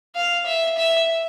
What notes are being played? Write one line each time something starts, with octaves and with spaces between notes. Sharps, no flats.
F5
E5
E5